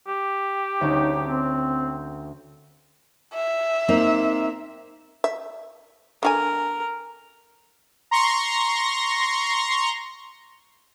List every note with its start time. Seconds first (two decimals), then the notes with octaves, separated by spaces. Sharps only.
0.07 G4
0.81 D2 C#4 D#4 A#4
1.24 C4
3.34 E5
3.88 A#3 C4 D#4
5.24 E5
6.23 D3 F#4 A#4 G#5
8.11 A#5 C6 C#6 A#6